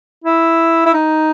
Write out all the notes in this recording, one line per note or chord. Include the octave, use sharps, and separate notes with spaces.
E4
E4
D#4